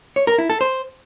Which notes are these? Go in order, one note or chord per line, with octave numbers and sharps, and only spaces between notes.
C#5
A#4
E4
A4
C5